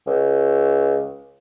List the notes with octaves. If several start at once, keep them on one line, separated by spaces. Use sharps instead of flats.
C#2